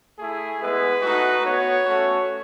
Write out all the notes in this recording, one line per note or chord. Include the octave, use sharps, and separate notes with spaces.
A3 E4 G#4
G#3 B3 E4 B4
A3 D#4 F#4
B3 F#4 C#5
A3 C#4 F#4